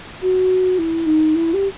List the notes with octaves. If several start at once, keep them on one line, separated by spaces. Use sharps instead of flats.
F#4
E4
D#4
E4
G4